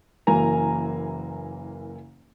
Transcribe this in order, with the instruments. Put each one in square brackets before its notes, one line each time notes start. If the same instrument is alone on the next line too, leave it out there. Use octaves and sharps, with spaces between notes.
[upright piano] F#1 E3 A#3 G#5 A#5